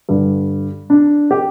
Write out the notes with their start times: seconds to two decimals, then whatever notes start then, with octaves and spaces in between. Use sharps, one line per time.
0.09 G2 D3
0.90 D4
1.31 G4